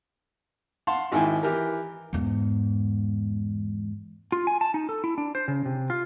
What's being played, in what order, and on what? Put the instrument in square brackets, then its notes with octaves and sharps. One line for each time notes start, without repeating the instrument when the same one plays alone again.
[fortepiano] F5 F#5 A5 C6
G#1 G#2 E4 G5 G#5
E3 G4 A#4
[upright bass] E2 G#2
[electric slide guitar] F4
G#5
A5
D#4
A4
E4
D4
C5
C#3
C3
F4